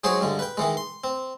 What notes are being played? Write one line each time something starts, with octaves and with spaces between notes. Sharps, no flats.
F#3 G#3 D#4 G#4 C5 C#5
G2 D3 G#3
B4 G5
D#3 E3 G#3
C6
C4